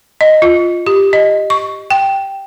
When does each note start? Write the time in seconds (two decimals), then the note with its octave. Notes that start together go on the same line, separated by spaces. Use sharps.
0.21 D#5
0.42 F4
0.87 G4
1.13 D#5
1.50 C#6
1.90 G5